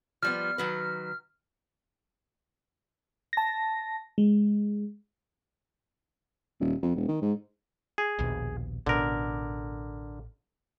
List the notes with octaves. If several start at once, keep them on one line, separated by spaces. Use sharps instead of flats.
F3 G3 B3 F6
D#3 F#3 B4
A5 A#6
G#3
D#1
F2
E1
D#3
G#2
G#4
A#1 D#2 B2
A1 B2 D3 A#4